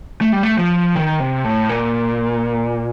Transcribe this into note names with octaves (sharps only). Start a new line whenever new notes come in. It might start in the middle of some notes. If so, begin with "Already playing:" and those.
A3
G3
A3
F3
D#3
C3
A2
A#2